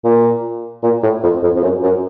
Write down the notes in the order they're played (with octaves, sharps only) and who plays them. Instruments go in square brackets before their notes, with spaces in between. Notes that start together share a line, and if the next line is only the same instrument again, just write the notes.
[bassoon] A#2
A#2
A2
F2
F2
F2
F#2
F#2